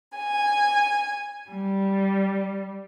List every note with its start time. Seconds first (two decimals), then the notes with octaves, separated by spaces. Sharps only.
0.17 G#5
1.49 G3